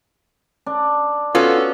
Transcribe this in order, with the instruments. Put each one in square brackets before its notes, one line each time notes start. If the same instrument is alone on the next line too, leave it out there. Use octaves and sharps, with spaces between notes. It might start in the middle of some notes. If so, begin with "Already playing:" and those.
[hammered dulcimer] D4
[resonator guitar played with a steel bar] B3 C#4 F#4 [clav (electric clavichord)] F4 [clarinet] A4